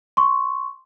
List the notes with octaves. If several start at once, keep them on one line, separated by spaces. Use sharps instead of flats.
C6 C#6